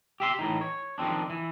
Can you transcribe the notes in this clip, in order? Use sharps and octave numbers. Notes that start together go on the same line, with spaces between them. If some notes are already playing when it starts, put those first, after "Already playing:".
G4 E5 C6
A2 E3 D#4
C#5
D#3 F3 G#3 C4 D4
E3